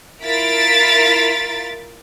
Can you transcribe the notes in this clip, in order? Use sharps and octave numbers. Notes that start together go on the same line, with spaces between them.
E4 F4 A#4 A6 B6 D7